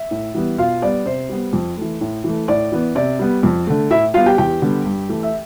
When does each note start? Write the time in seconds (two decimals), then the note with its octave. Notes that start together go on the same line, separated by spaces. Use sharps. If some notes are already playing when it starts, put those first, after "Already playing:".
Already playing: E5
0.11 A2
0.35 E3 G3 B3
0.58 B2 F4 F5
0.82 G3 B3 D5
1.06 C3 C5
1.29 G3 B3
1.53 F2
1.77 E3 A3
2.01 A2
2.24 E3 A3
2.48 A2 D5
2.72 E3 B3
2.95 C3 D5
3.19 G3 B3
3.43 F2
3.67 D3 A3
3.90 A2 E4 E5
4.14 G3 B3 F4 F5
4.26 G4 G5
4.38 E2 G4 G5
4.62 D3 G3 B3
4.85 G2
5.09 E3 A3
5.23 E5